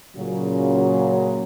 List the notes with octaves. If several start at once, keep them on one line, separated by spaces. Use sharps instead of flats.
A#2 C#3 F#3